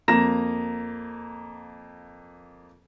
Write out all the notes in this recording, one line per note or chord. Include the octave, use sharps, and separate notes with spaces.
F2 A#3 A#5 A#6 E7